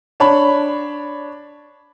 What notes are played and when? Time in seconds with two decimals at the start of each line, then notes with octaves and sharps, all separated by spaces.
0.20 D4 C#5 A5 B5